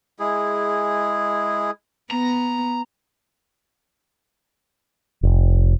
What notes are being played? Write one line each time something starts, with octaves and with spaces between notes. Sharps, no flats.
G#3 E4 G#4
B3 A#5
F1